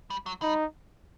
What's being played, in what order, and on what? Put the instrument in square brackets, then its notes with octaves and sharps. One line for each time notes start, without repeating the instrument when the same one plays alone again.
[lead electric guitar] G3
F#3
[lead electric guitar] G3 [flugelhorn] D#4